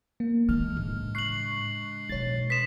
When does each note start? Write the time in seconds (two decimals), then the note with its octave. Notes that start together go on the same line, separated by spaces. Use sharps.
0.20 A#3
0.49 D#3 E3 G#3 D4 F6
0.77 A2 C#3
1.15 C#6 F#6 C7 F#7
2.09 B2 E3 C#5 A6
2.50 B4 C6 D#6 B6 E7